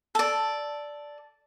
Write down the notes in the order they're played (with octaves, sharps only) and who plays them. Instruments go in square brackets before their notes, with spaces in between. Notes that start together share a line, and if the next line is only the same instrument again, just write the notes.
[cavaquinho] A4 D5